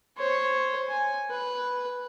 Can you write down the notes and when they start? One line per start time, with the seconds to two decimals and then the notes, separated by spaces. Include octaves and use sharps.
0.17 C5 C#5
0.87 G#5
1.30 B4